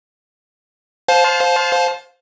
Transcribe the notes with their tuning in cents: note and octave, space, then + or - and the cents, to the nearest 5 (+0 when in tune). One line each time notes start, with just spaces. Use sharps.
C5 +0 F5 +25 A5 -25